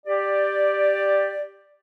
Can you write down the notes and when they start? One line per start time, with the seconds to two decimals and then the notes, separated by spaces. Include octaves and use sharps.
0.06 G4 D5